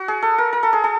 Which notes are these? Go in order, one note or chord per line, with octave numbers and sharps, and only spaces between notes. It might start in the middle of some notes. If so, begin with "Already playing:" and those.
Already playing: F#4
G#4
A4
A#4
A#4
A4
G#4
A4